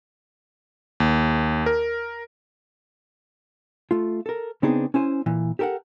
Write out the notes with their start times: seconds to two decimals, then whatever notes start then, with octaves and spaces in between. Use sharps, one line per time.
1.00 D#2
1.66 A#4
3.91 A3 F4
4.26 A4 A#4
4.63 C#3 B3 C4 D4 D#4 G#4
4.94 C#4 E4 C5 G#5
5.26 A#2 E3
5.59 G4 A4 A#4 F5 F#5